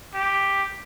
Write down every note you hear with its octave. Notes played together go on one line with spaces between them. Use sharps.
G4